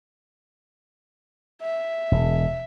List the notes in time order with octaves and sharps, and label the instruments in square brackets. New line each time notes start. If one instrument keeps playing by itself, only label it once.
[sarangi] E5
[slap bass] E1